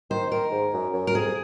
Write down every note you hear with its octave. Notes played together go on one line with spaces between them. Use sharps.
D#3 C5
D#3 A#4
G#2
F#2
F#2
A#4
F2 G#4